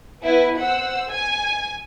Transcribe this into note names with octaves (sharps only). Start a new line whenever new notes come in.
B3 E4 B4 G#5
C5 F#5 E6
G#5